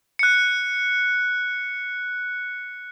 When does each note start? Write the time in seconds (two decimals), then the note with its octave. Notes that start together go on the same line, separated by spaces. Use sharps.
0.19 F#6 C#7